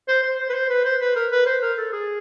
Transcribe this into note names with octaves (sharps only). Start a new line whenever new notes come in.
C5
C5
C5
B4
C5
B4
C5
B4
A#4
B4
C5
A#4
A4
G#4